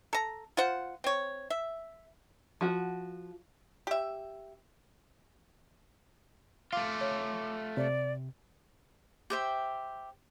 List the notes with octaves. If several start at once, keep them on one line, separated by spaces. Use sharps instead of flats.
A4 A#5
F4 C5 F#5
C4 C#5
E5
F3 F#4
G4 E5
A3 F4 F5 D6
C#5
C3 D5
G4 C5 E5